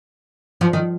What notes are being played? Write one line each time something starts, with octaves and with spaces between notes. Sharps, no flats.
F3
D#3